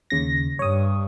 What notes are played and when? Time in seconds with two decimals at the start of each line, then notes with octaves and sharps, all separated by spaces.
0.10 D#2 C#3 A#6
0.59 G2 C#5 D#6